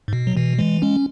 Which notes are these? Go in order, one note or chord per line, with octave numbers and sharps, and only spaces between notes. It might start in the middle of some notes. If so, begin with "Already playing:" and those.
G#2
B2
F#3
B2 E3
E3 G#3
G#3 C#4